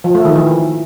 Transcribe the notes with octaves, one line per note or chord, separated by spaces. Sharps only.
F3
A3
D#3
E3